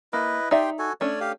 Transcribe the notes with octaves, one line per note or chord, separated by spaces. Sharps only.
A#3 E4 B4 D#5
D#4 G4 D5 E5 G5 C6
F#4 A4 G#5
A3 C#4 D4 C#5 D5
G4 F5